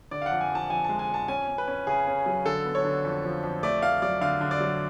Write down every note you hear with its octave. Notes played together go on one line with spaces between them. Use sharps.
D3 D5
F5
F2 F#5
G#5
F3 A5
F2 G#5
G#3 A5
G#5
F2
A5
C#4 G#5
C#4
B4
C#4
C#3 G#4
C#4
F#3
D3 A4
B3
C#5
D3
F2
F3
F2
A3 D5
A3 F5
F#3 D5
D3 F5
D3
D5
F#3